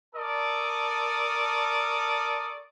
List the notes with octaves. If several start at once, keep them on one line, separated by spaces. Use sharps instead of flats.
A4 A#4 D5 A5 C#6 D#6